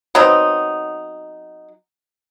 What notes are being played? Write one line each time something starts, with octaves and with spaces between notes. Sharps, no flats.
F#3 B3 C4 D#4